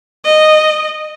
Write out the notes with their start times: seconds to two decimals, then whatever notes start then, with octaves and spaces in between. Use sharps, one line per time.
0.25 D#5